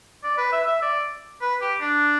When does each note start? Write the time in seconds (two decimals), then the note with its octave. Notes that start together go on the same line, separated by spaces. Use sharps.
0.24 D5
0.38 B4
0.52 E5
0.67 E5
0.82 D5
1.41 B4
1.61 G4
1.81 D4